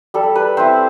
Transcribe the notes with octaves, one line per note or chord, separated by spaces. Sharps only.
G3 A4
B4
C4 E4 C5